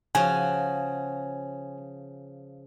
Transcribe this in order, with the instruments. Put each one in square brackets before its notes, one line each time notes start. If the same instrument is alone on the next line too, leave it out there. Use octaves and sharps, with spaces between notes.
[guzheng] C#3 F3 F#4 [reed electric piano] G#5